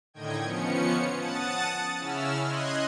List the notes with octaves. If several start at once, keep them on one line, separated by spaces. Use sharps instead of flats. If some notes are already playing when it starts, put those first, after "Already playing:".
A2 D3 D#3 D#5 G5 G#6
F3 B3 C#4 C#7
F#5 A5 D#6 A6
C#3 C#4 E4 E6 F6
D#5 C6 F#6 G#6